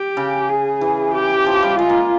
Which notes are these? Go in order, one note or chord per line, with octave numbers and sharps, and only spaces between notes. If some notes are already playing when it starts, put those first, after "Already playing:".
Already playing: G4
C#3
G#4
E3
G4
F3
G3
G#3 F4
A#3